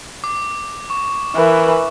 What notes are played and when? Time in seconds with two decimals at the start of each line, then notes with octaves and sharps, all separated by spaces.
0.24 D6
0.90 C#6
1.36 E3 A#4 B4